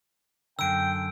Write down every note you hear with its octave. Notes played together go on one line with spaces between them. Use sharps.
F#2 D3 G5 E6 D7